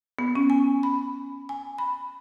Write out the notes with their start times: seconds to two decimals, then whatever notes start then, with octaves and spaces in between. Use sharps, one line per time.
0.19 B3
0.35 C#4
0.50 G#5
0.83 B5
1.49 G#5
1.78 B5